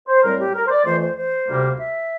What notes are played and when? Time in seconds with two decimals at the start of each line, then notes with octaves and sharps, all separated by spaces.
0.08 C5
0.24 A2 G3 C4 A#4
0.39 G4
0.55 A#4
0.66 C5
0.70 D5
0.85 F2 E3 A3 C5
1.01 C5
1.17 C5
1.47 D2 C3 G3 A#3
1.78 E5